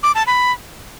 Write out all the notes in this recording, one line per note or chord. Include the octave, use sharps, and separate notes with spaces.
D6
A5
B5